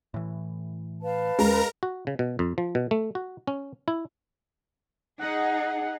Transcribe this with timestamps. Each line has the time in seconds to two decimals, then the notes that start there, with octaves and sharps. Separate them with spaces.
0.14 A2 E3
1.02 B4 F5 A5
1.39 D#2 G#3 C#4 A#4 A#5
1.83 F#4
2.07 C#3
2.19 B2
2.39 F2
2.58 F3
2.75 B2
2.91 A3
3.15 F#4
3.47 C#4
3.88 E4
5.19 D#4 G#4 F#5